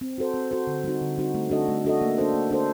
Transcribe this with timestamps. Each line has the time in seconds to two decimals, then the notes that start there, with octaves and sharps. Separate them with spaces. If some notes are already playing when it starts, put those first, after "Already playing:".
0.01 C4
0.18 F#4 A4 C5
0.34 C4
0.51 F#4 A4 C5
0.67 D3
0.84 G3 C4 D#4 F#4
1.01 D3
1.18 G3 C4 D#4 F#4
1.34 A3
1.50 D4 F#4 A4 D#5
1.68 A3
1.85 D4 F#4 A4 D#5
2.01 A#3
2.18 D4 A4 C5
2.34 A#3
2.51 D4 A4 C5